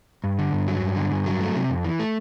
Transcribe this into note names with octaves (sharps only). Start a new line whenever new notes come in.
G2
D3
G2
F#3
G2
D3
G2
F#3
A3
C3
F2
E3
A3